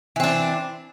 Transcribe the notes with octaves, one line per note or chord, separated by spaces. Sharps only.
E3 C4 D4